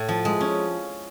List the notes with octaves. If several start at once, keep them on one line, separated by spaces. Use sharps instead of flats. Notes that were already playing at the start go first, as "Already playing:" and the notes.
Already playing: A2
F3
G#3
C#4